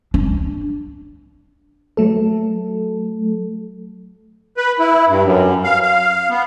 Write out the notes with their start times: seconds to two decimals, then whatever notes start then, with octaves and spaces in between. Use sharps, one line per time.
0.14 D4
1.97 F#3 A3 A4
4.57 B4
4.80 E4
5.08 G2
5.24 F#2
5.64 F5
5.83 F5
6.30 B3